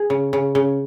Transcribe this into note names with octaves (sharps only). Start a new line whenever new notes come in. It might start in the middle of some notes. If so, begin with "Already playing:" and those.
Already playing: G#4
C#3
C#3
C#3